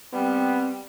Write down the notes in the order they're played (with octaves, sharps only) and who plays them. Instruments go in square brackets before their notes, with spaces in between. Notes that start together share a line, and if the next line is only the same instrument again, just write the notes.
[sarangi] G3 [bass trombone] B3 [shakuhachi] C4